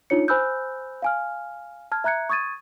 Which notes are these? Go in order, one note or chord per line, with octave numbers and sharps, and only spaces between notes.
D4 D#4 F4 C#5 C#7
C5 G#5 B5 E6 F#6 G6
F5 G#5 F6
A5 F6 G#6
E5 A#5 F#6 G#6 C#7
C#6 D#6 G#6 A6 D#7